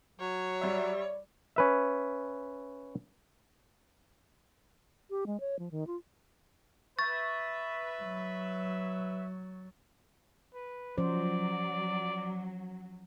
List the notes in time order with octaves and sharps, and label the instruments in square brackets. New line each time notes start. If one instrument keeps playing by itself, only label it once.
[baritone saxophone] F#3 [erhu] C#5
[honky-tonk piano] G3 E5 [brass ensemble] D5
[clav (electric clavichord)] C#4 B4 E5
[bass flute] G4
G#3
C#5
F3
D#3
F4
[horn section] B4 E5 [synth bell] C#6 [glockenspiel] A6
[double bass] F#3
[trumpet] B4
[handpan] F3 C#4 C5 [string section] F#3 [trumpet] D5